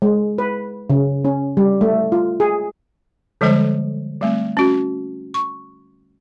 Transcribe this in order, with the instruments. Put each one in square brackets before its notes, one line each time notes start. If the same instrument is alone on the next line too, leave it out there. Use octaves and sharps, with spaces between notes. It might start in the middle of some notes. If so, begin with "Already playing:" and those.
[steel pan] G#3
B4
C#3
C#4
G3
A3
F4
G#4
[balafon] D3 F3 G3 G#3 A4 C5
G3 A3 C4
C#4 F#4
C#6